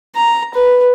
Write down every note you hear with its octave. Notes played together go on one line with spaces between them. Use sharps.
A#5
B4